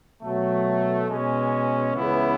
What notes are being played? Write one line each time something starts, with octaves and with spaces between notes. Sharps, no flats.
B2 F#3 A3
B2 G#3 C#4
C#2 C#3 E3 B3 E4